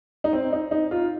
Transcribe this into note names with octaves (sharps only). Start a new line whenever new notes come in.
D#4
C4
D#4
D#4
F4